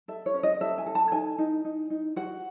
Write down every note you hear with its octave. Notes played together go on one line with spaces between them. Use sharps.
A4 E5
C#5
C#4
D#5
A4 E5
G#5
A4
A5
D#4 G#5
D#4
D#4
D#4
F#4 F#5